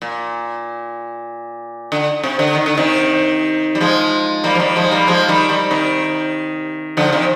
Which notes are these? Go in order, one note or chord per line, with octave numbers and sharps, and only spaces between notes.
A#2
D3
C3
D3
D#3
D3
C3 D#3
G3
F3 G#3
G3 A#3
F3
D#3 G3
F3 G#3
G3 A#3
F3 G#3
D#3 G3
D#3 G3
C3 D#3
D3 F3
C3 D#3